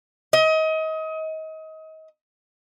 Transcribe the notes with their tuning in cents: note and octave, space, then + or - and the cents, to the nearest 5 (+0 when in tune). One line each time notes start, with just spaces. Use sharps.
D#5 +30